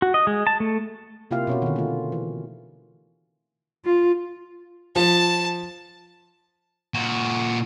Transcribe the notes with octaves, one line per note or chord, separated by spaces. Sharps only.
F#4
D#5
G#3
A5
A3
C3 A#3 E4 F4 G4 F5
B2 C#4 F#4
D3 D#3
A3 F4
E3
F4
F3 A5
A#2 F#4